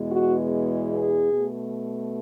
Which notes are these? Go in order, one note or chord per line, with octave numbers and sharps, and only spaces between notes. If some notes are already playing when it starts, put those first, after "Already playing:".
Already playing: E2 B2 G#3
F#4
G#4
B2 A3